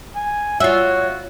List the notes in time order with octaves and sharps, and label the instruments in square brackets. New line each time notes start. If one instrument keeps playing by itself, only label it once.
[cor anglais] G#5
[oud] F4 E5 [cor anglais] F#4 [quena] C#5